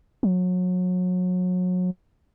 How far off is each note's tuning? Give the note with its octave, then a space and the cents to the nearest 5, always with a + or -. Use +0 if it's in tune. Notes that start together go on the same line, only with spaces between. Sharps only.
F#3 -30